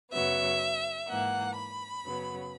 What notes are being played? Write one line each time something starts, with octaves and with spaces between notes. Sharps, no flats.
F#2 C#3 F#3 B3 E5
G#2 E3 A#3 F#5
B5
F#2 C#3 F#3 B3